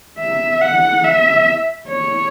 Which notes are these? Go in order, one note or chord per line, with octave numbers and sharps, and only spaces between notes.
E5
F#5
E5
C#5